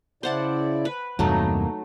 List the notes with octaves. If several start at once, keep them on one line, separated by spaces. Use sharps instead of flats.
C#3 E4 C5 D5 F#5 A5
B4
E2 G2 C3 F#3 A3 A#3 D#4